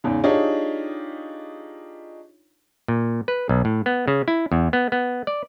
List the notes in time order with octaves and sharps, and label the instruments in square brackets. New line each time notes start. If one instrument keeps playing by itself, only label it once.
[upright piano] E2 G#2 C#3
D4 D#4 F4 G4 G#4 C#5
[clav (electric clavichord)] A#2
B4
B1
A2
B3
C#3
E4
E2
B3
B3
D5